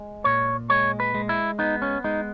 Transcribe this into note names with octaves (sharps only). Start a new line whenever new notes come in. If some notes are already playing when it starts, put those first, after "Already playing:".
Already playing: G#3
A#2 C#5
G#3 C#5
B4
G#3
E4
B3 D#4
C#4
G#3 D#4